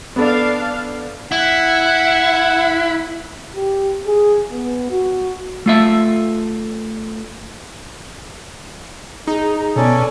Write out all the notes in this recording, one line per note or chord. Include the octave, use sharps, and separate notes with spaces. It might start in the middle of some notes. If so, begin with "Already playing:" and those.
B3 D4 A4 D5 F5
E4 F#5
G4
G#4
B3
F#4
A3 F4 E5
D#4 G#4 A#5
B2 B3 C#4 A4 D5 G#5